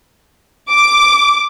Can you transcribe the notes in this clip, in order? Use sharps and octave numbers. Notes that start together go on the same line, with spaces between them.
D6